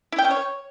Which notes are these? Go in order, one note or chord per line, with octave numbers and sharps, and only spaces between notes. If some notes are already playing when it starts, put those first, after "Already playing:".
E4
G5
C#4
C#5